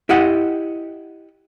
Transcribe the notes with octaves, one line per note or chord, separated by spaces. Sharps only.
E4 G4 D#5 F#5